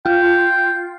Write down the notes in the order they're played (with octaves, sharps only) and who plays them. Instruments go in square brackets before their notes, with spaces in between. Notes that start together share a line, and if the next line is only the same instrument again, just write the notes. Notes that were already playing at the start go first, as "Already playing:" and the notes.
[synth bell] F4 [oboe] G5